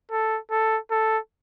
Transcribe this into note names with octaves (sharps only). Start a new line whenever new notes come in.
A4
A4
A4